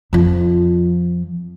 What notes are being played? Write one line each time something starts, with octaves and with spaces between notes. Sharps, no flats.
F2 F3